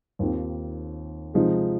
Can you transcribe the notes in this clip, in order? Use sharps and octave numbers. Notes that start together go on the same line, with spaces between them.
D#2 D#3 C4 F4
C3 F3 G#3 D#4